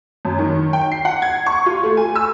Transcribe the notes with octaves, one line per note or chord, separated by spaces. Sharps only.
F#2
D#3
G5
C7
F#5
G#6
C#6
F4
A3
G#5
E6